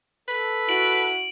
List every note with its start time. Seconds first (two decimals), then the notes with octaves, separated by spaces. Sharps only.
0.28 A4 B4
0.69 E4 F#4 D7 F#7